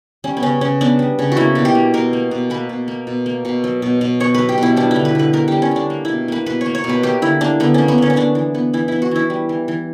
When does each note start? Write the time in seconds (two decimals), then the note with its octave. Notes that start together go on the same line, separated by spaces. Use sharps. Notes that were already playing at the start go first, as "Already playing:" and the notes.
0.24 G3 C#4
0.37 B3
0.43 C#3 C#4
0.61 C#3 C#4
0.81 B3 D4
0.99 G3
1.19 C#3
1.32 F#4
1.37 A#3 E4
1.55 B2
1.65 G4
1.75 A#3
1.94 B2 A#4
2.13 A#3
2.31 B2
2.50 A#3 B4
2.69 B2
2.88 A#3
3.07 B2
3.26 A#3
3.45 B2
3.64 F#3
3.82 B2
4.01 B2
4.20 B3 C#5
4.35 F#3 B4
4.49 G4
4.58 B2 E4
4.77 G3 D4
4.91 D3 E4
5.05 B4
5.15 D3 B4
5.33 B3 A#4
5.48 G3 G4
5.62 C#4
5.71 D3 D4
5.90 A#3
6.05 B2 E4
6.28 A#3 B4
6.46 B2 B4
6.61 C#5
6.66 A#3
6.75 C#5
6.84 B2
6.89 B4
7.03 A#3 G4
7.22 D3 E4
7.41 A#3 D4
7.60 D3 B3
7.74 A#3 C#4
7.88 B3
7.98 D3 C#4
8.10 C#4
8.16 B3 D4
8.35 E3
8.55 B3
8.73 E3 E4
8.88 B3 E4
9.02 F#4
9.11 E3 E4
9.30 G3
9.49 E3
9.68 E3